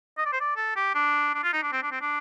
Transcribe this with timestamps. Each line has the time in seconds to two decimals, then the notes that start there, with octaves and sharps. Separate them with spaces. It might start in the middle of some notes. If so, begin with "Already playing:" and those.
0.18 D#5
0.25 D5
0.33 C5
0.40 D5
0.56 A4
0.76 G4
0.95 D4
1.35 D4
1.43 F4
1.53 D#4
1.62 D4
1.72 C4
1.83 D4
1.92 C4
2.01 D4